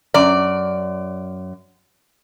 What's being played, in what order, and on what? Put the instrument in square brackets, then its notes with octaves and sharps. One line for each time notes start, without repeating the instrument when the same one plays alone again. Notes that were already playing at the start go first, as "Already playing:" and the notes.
[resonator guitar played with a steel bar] F#2 D5